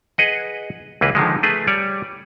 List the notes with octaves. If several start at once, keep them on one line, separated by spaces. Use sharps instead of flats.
G#4 B4 D#5 F#5
C#2 E3 A#3 B4
D3 D#3 F3 G#3
A3 G#4 B4
G3 C#5 D5